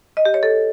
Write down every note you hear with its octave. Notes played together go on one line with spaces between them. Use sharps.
D#5
G4
C#5
A4